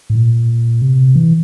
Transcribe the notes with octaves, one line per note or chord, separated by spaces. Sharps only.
A2
A#2
C3
E3